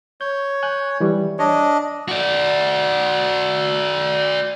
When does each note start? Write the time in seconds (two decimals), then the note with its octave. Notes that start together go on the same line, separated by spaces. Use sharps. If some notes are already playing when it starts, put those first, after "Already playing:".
0.21 C#5 G6
0.63 G#5 F#6 G6
1.00 E3 G3
1.39 D4 C#5 D#5
2.08 F#4 D5